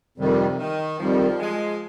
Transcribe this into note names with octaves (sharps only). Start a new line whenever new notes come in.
F2 C3 D#3 G3
D#3
F2 D#3 F3 G3
F3 G#3